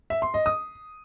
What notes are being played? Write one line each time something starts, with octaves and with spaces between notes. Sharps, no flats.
E5
C6
D#5
D#6